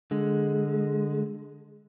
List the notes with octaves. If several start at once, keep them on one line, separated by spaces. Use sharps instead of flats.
D3 G#3